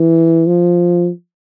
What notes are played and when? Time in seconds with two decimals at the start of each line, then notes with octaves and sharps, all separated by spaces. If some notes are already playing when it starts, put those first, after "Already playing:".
Already playing: E3
0.47 F3